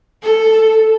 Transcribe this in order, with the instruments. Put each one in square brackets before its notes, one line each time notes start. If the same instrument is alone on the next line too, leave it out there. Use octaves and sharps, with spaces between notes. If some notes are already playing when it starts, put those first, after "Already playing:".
[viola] A4